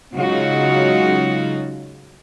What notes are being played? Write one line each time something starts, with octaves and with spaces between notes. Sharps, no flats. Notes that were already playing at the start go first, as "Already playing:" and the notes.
C#3 F#3 G#3 D#4 F4 F#4